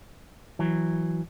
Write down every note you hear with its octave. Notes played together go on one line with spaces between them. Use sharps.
E3 F#3